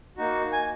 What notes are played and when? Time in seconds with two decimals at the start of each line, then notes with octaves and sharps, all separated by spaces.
0.17 A#3 D#4 F#4
0.52 G#5